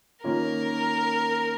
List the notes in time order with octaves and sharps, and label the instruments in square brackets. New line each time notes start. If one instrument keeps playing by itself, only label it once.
[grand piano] D#3 A#3 C#4 F4 [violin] A#4